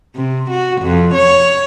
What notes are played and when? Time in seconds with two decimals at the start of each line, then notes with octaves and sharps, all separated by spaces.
0.16 C3
0.51 F#4
0.82 F2
1.15 C#5